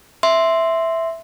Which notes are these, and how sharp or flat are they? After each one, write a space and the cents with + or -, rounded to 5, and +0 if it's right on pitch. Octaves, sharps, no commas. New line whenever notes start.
E5 +0 C6 +0